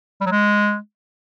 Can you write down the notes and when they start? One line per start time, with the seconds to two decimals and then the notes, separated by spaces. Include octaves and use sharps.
0.21 G3
0.26 F#3
0.31 G#3